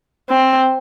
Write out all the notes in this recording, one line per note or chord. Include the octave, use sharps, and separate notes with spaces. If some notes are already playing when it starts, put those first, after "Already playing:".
C4